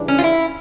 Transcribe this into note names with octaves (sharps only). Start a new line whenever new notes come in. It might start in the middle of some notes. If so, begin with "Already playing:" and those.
Already playing: C#3 E3 G3 D4
C#4
F4
E4